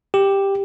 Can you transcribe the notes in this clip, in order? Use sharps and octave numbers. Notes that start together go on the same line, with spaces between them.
G4